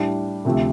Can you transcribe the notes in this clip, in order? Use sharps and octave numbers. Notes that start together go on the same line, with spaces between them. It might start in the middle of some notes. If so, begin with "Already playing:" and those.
Already playing: A2 G3 D4
D2 C3 F3 A3